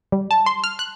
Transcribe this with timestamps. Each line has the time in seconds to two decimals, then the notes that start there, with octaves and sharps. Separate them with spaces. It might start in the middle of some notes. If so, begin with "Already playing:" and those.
0.12 G3
0.31 A5
0.46 C6
0.64 F6
0.79 F#6